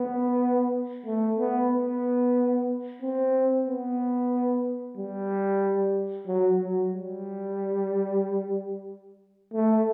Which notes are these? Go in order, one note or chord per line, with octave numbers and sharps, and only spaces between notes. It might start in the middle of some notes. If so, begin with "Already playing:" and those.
Already playing: B3
A3
B3
B3
C4
B3
G3
F#3
F#3
G3
A3